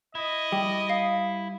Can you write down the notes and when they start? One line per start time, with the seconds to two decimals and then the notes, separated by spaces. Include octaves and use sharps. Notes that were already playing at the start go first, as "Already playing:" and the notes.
0.15 E4 D#5
0.52 G3 G5
0.90 F5